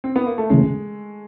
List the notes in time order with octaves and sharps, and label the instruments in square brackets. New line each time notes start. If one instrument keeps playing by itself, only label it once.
[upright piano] C4
B3
A#3
A3
[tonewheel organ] C#3 E3 A3 C#4 [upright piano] G#3